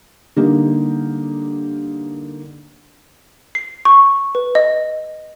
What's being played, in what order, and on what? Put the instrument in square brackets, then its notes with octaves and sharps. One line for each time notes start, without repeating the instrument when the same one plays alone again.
[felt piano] D3 G3 A#3 D#4 G4
[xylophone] C7
C#6
B4
D#5